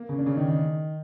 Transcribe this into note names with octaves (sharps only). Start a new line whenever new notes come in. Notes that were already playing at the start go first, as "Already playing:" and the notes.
Already playing: A#3
C#3 C#4
D4
C#3 C#4
D#3 D#4
D#3 D#4